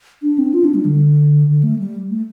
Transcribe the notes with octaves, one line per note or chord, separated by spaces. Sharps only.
D4
C4
F4
D4
G3
D3
D3
A3
G3
A3